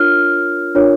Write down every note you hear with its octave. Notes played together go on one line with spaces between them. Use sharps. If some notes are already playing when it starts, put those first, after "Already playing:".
Already playing: D4 F4 A#4 C#5 F6
D4 F4 A#4 C#5